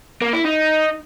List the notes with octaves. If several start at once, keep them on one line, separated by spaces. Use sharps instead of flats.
A#3
E4
D#4